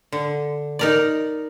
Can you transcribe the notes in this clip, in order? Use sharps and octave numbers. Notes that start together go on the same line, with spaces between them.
D3
D#4 A#4 D5